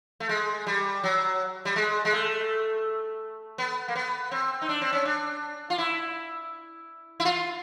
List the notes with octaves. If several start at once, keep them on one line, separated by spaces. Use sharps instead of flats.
A3
G#3
G3
F#3
G3
G#3
G#3
A3
B3
A#3
B3
C4
D#4
D4
C4
C#4
D4
F4
E4
E4
F4